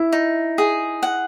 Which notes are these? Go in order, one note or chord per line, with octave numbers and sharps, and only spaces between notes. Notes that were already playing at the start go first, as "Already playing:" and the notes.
Already playing: E4 E5
D#4
G#4
F#5